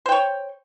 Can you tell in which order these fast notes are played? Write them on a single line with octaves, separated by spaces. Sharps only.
C5 G5 C#5